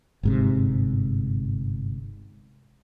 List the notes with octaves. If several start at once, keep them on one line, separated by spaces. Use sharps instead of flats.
G1 G#2 C3